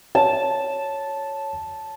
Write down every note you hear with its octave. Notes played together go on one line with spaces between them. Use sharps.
C#5 A5